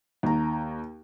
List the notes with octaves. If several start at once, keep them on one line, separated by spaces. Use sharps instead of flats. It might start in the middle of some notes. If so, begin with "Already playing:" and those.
D#2 A#5